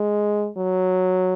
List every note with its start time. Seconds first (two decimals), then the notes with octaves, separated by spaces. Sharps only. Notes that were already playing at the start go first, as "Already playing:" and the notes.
Already playing: G#3
0.57 F#3